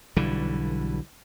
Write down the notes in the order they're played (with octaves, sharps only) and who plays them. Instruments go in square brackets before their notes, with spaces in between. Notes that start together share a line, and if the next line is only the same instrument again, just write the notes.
[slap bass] B1 D3 E3 G3